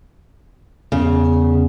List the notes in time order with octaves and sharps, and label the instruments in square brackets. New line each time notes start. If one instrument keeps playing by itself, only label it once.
[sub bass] E2 [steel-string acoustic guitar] C#3